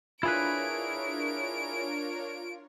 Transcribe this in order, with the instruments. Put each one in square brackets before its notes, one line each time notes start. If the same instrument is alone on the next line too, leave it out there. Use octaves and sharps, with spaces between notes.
[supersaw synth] D4 A#4 C#5 [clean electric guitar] E4 G#4 B4 [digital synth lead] F4 [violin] D7